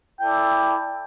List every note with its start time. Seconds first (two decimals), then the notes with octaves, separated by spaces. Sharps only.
0.20 E4 A4 D5 G5